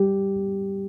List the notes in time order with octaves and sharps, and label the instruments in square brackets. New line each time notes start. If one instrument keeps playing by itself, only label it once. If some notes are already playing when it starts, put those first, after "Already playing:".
Already playing: [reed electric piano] G3 G4